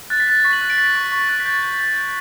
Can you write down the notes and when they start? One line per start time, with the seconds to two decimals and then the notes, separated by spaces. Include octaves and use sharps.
0.10 F#6 A6
0.20 B6
0.27 F#6 A6
0.40 A6
0.44 C#6 B6
0.53 F#7
0.61 F#6
0.70 D7
0.78 F#6 B6
0.96 C#6
1.12 C#6
1.29 F#6
1.40 B6
1.45 G6 A6
1.63 G6
1.80 G6
1.96 G6